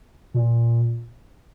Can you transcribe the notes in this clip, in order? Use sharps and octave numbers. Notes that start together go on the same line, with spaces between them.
A#2